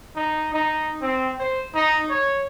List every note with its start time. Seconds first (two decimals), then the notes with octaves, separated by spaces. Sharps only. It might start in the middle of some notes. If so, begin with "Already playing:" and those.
0.15 D#4
0.54 D#4
1.02 C4
1.39 C5
1.74 D#4
2.09 C#5